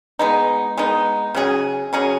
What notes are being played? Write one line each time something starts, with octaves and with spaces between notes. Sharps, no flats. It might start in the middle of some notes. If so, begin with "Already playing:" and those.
G#3 B3 D#4
G#3 B3 D#4
C#3 F#3 C#4 G#4
C#3 F#3 C#4 G#4